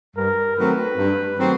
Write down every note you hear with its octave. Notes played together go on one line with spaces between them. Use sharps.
G2 A#4
D#3 F#3 A3 C4 B4
G2
D#3 F#3 A3 C4